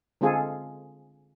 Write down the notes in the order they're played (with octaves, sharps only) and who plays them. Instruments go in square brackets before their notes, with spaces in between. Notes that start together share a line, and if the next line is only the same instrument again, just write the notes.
[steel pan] D3 G#3 C4 F4 G#4 A4